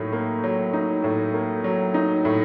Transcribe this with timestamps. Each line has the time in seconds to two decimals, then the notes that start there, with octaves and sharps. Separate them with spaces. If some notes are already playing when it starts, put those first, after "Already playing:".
Already playing: A2 F#3 A#3 D#4
0.13 A#3
0.44 F#3
0.73 D#4
1.04 A2
1.34 A#3
1.64 F#3
1.94 D#4
2.25 A2